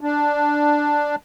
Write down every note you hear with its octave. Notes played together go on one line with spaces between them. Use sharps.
D4